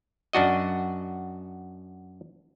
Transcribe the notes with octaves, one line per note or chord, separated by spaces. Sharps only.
F#2 D4 F#4 D#5